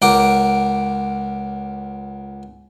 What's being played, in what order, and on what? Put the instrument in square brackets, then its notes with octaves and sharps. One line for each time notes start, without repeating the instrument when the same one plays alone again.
[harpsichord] C#2 A#4 F#5 G5 D6